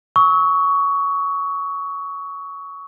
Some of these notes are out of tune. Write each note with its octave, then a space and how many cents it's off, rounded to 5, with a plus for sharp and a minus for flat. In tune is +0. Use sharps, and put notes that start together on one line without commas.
C#6 +15 E6 -40